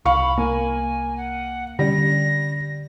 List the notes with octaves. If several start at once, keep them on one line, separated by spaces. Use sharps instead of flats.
C2 F5 B5 C#6
A#3 G#5
F#5
D3 G3 C#4 A#6